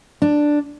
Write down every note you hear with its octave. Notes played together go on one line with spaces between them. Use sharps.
D4